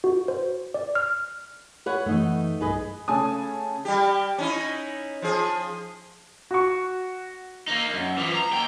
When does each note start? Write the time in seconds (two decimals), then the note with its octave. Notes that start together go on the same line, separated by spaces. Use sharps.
0.04 F#4
0.28 C5
0.74 D5
0.95 F6
1.86 B4 C#5 F#5
2.06 F#2 E3 A3 D#4
2.60 B1 G2 G#4 B4 D#5
3.08 C#3 A3 G#5 A5 D#6
3.85 G3 G4
4.38 C#4 D#4 E4
5.22 F3 G#4
6.51 F#4 C#6
7.67 A#3 D#4
7.94 F#2
8.18 E3 F3
8.35 A#5
8.52 D#2 G5